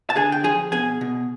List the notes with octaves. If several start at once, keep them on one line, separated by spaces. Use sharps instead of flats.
A5
D3 G#4 G#5
G5
F3 G#4 G#5
B2 G#4 G#5
B2